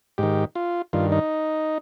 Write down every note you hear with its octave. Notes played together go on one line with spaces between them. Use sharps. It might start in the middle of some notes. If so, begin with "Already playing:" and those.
G#2 D#3 G4
F4
G2 D#3 F4
D#4